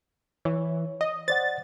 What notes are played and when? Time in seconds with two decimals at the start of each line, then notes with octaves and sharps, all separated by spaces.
0.45 E3 C#5
1.01 D#5
1.28 C5 D5 F#5 A6